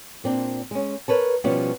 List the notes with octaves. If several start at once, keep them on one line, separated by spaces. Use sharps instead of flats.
A#2 C4 D4
G#3 C#4
A#4 B4 C#5 A5
B2 F3 G3 B3 C#4